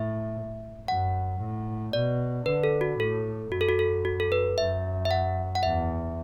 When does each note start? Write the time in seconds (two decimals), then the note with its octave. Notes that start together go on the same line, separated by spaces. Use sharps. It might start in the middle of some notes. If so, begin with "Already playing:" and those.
Already playing: A2 E5
0.88 F#2 F#5
1.40 A2
1.93 B2 D5
2.46 D3 B4
2.64 A4
2.81 F#4
2.99 A2 A4
3.52 F#2 F#4
3.61 A4
3.69 F#4
3.79 A4
4.05 F#4
4.20 A4
4.32 B4
4.58 F#2 E5
5.05 E5
5.11 F#5
5.55 F#5
5.63 E2 E5